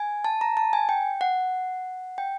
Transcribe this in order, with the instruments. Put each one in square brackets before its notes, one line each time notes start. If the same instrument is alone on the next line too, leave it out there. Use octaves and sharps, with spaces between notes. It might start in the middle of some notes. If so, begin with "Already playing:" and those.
Already playing: [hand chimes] G#5
A5
A#5
A5
G#5
G5
F#5
G5